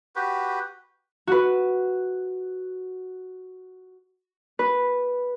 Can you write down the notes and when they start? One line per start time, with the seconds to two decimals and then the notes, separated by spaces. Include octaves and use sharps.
0.16 F#4 G4 B4
1.27 F#4 B4
4.59 B4